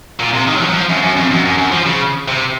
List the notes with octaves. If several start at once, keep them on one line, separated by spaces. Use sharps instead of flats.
A#2
C3
D#3
F#3
F3
F#3
F3
F#2
F#2
F2
F#2
F#2
F#2
F3
C#3
C3